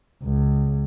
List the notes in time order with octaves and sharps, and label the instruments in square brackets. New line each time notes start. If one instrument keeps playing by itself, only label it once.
[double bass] C#2